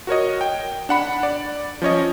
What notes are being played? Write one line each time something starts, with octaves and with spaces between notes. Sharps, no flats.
F#4 A#4 C#5 D#5
G5
D4 F#5 B5
D5
F3 C#4 C#5 D#5